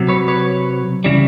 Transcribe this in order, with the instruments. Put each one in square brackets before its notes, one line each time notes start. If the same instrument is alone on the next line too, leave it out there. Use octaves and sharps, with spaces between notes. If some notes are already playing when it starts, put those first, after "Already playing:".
Already playing: [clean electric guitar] C3 F#3
B4 C#5
B4 C#5
C#3 E3 G3